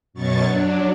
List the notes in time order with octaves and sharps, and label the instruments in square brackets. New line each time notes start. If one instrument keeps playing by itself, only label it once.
[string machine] F#2 B2 F#3 C#6 A6
F#3 D4